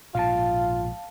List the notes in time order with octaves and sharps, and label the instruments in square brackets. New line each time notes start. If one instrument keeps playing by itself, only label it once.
[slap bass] A#1 G#2 B2 [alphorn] F4 [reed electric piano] F5 A5